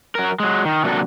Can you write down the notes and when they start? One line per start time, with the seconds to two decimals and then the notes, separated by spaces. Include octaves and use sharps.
0.15 F#3 A#4
0.40 F#3 G#3
0.65 D#3
0.84 C3 F#3 A#3 D4 F#4 A4